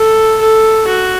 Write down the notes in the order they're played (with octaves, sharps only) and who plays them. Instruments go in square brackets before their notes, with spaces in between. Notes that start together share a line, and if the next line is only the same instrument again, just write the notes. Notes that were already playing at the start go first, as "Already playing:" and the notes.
Already playing: [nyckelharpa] A4
A4
F#4